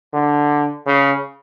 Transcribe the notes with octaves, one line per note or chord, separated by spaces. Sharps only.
D3
C#3